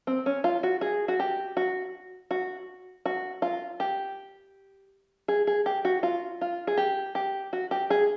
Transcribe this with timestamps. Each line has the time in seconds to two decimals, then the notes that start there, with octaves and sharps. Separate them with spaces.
0.07 C4
0.26 C#4
0.44 F4
0.63 F#4
0.81 G#4
1.08 F#4
1.20 G4
1.57 F#4
2.31 F#4
3.06 F#4
3.42 F4
3.80 G4
5.28 G#4
5.47 G#4
5.66 G4
5.85 F#4
6.03 F4
6.41 F4
6.67 G#4
6.77 G4
7.15 G4
7.53 F#4
7.71 G4
7.90 G#4